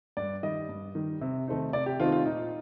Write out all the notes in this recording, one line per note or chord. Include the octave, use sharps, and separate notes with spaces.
G2 D5
D#3 G3 D#5
G2
D#3 G3
C3
D#3 A3 C4 D#4
C3 D5
G4
D#3 A3 C4 D#4 F4
F4
A#2 D#4